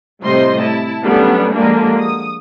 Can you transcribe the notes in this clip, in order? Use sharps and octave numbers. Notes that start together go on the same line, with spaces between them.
A2 C3 G3 C5 D#5 C6
E4 A5
F#3 G3 A3 B3 C#4 D4
D3 F3 G3 G#3 A#3 D4
D#6